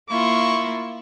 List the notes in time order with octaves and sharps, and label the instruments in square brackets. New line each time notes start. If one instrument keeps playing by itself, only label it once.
[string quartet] A#3 E4 F4 [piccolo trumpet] C#6